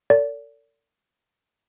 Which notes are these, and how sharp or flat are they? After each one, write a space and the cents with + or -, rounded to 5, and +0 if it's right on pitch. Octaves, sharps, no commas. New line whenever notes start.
A4 +45 D5 -35